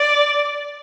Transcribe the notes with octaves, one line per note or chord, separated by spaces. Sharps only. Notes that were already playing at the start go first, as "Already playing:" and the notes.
Already playing: D5